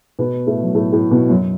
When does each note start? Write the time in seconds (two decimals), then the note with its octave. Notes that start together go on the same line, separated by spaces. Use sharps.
0.19 B2 B3
0.47 A2 A3
0.63 F#3
0.74 A2 A3
0.92 A2 A3
1.11 B2 B3
1.29 F#2 F#3